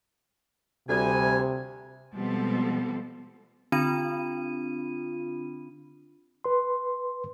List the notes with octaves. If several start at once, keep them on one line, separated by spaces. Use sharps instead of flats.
D2 C3 G3 G#5
B2 F3 G3 G#3 C4 A4
D3 C4 D4 F4 B5 D#7
B4 C6